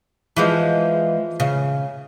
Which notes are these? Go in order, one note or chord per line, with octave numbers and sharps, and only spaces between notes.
E3 F3 G#3
C#3